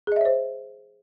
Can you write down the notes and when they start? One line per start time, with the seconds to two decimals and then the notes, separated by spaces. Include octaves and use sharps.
0.07 G#4
0.12 D#5
0.16 E5
0.21 C#5
0.25 C5